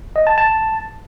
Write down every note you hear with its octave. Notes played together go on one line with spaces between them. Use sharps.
D#5
A5
A5